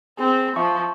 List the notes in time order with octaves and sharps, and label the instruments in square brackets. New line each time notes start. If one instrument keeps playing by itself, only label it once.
[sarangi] C4 [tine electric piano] G#4
[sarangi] F3 [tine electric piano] E5 C#6